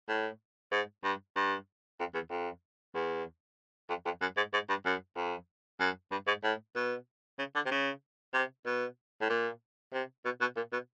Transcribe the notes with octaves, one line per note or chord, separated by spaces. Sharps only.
A2
G#2
G2
G2
F2
E2
F2
E2
F2
F2
F#2
G#2
G#2
G2
F#2
F2
F#2
G2
G#2
A2
B2
C#3
D3
C3
C#3
C3
B2
A2
A#2
C3
B2
B2
A#2
B2